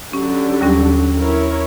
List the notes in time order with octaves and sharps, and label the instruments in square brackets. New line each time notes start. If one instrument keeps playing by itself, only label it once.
[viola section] D3 F#3 G4 [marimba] C#4
[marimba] D#2 G3 C#4
[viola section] E4 A#4 C#5